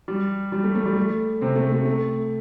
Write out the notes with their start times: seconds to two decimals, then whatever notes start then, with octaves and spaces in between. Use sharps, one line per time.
0.08 G3
0.52 G3
0.64 A3
0.75 A3
0.86 G3
0.96 A3
1.41 C3 C4
1.56 A3
1.72 A3
1.85 A3